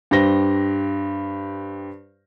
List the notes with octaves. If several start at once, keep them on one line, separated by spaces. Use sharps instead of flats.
G2 G4 C5 A#6 G7